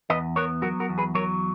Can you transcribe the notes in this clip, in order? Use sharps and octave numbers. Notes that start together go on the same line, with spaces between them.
E2 B4 D#5
B3 A#4 C#5
F#3 F#4 A#4
F#4 A#4
E2
G#4 B4
F#3 A#4 C#5